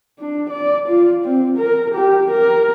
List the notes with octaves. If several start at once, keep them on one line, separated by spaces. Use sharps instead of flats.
D4
D5
F4
C4
A#4
G4
A#4